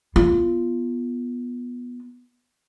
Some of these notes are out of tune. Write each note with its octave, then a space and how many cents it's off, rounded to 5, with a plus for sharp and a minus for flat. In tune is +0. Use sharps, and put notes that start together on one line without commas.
B3 -10 F4 -15